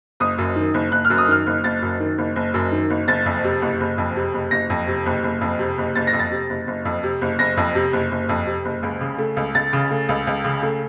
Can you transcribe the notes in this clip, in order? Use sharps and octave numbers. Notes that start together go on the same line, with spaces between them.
F#1 D#6
F#2
D#3
F#1
F#1 F#6
F6
F#2
D#6
D#3 F6
F#1
F#1 A6
F#2
D#3
F#1
F#1
F#2
D#3
F#1
F#1 A6
F2
C3
F#1
F#1
F2
C3
F#1
F#1 A#6
F2
C3
F#1
F#1
F2
C3
F#1
F#1 A6
A#6
F2
A6
C3
F#1
F#1
F2
C3
F#1
F#1 A#6
F2
C3
F#1
F#1
F2
C3
F#1
C#2
C#3
A3
C#2
C#2 A6
C#3
A3
C#2
C#2
C#3
A3